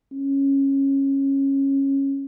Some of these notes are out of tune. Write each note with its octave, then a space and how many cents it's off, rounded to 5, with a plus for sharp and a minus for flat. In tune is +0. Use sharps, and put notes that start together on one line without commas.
C#4 -15